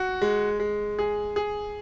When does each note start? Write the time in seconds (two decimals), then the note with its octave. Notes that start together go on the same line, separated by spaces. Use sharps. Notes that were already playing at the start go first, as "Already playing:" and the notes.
Already playing: F#4
0.22 G#3
0.60 G#3
0.99 G#4
1.36 G#4